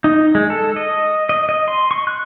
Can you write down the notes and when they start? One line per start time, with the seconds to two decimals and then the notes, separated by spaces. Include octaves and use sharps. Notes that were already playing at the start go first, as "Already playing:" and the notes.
0.04 D#4
0.35 G#3
0.50 A4
0.76 D#5
1.29 D#5
1.49 D#5
1.68 C6
1.91 C#6
2.07 F#6